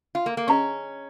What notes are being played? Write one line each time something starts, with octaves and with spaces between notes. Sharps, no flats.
F4
A#3
A#3
C#4 G#4 D#5 A#5 C#6